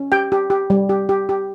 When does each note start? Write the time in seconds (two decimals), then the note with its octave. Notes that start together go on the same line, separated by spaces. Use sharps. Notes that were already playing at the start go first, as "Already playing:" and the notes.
Already playing: C#4
0.12 G4 G5
0.32 G4
0.50 G4
0.70 G3
0.89 G4
1.09 G4
1.29 G4